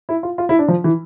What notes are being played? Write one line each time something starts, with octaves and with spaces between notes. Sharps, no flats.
E4
F4
F4
E4
D4
F3
E3